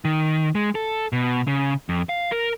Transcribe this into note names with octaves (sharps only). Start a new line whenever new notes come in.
D#3
G#3
A4
B2
C#3
F2
F5
A#4